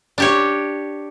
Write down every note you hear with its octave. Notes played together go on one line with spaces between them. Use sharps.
D4 G4 C#5